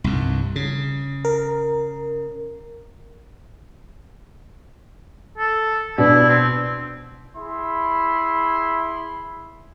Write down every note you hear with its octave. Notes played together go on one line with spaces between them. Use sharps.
C2 G2
C#3
A#4
A4
B2 D4 E4
C4
E4 G#4 B5 C6